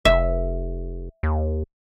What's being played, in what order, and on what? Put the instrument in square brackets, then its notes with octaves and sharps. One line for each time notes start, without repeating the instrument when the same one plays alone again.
[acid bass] F1 [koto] E5
[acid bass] D#2